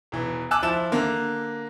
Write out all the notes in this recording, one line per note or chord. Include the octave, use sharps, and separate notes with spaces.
E1 E3
G#5 A5 D6 E6 F#6
F3 E4 A5 E7
D3 A#3